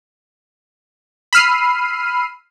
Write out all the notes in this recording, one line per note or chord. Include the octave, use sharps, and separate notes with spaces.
B5 E6 F6 C7 D#7